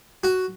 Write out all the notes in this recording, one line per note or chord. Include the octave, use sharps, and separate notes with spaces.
F#4